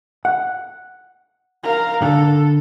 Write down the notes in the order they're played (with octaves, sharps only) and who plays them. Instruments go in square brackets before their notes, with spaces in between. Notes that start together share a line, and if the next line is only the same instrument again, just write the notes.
[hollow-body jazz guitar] F#5
[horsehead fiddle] A#4 F5
[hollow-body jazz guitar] D3 [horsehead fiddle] A4